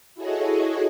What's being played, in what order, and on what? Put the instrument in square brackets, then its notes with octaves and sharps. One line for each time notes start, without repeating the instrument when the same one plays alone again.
[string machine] E4 F#4 G#4 A4 C#5 D#5